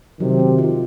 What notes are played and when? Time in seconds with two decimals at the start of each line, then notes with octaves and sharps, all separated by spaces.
0.20 C3 D#3 F#3
0.39 C4
0.59 F4